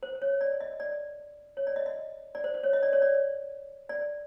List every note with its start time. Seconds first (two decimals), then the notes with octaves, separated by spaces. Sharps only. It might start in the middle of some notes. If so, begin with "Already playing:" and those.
0.03 C5
0.22 C#5
0.41 D5
0.60 D#5
0.80 D5
1.57 C#5
1.67 D5
1.76 D#5
1.86 D#5
2.35 D5
2.44 C5
2.54 C5
2.63 C#5
2.73 D#5
2.83 D5
2.93 C#5
3.02 D5
3.89 D5